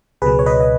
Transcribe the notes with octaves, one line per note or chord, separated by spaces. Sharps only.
C#2 B2 F#3 G#4 B4
C#5
B4 D#5
D#5